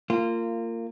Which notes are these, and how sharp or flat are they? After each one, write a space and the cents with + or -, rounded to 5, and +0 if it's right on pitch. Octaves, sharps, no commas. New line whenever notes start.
A#3 -25 F4 -15